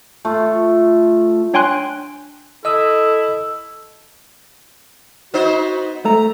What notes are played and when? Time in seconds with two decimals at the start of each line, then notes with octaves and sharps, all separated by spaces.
0.25 A3 F4
1.54 D4 C#5 G5 G#5 C6 F#6
2.65 E4 A4 D#5 D#6 E6
5.34 B3 D#4 F#4 C5
6.05 A3 A#5